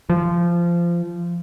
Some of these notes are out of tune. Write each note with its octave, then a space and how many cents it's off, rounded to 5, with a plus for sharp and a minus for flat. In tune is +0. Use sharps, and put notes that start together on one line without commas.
F3 -20